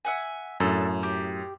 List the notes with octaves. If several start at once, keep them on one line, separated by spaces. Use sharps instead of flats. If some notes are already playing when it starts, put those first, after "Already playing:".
E5 F#5 G#5
F#2 A2 D4 A4 E6
G4 D6